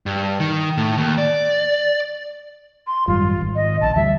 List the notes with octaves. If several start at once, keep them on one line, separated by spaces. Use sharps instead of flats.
G2
D#3
A2
D#2
D5
C6
G#1 F#2 G3 F4
G#1
D#5
A#1 A5
D2 E3 G3 E5